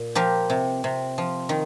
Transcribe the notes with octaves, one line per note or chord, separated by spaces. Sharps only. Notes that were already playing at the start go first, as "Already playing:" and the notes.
Already playing: A#2
F3 G4 A#4
C3
C3
F3
D#3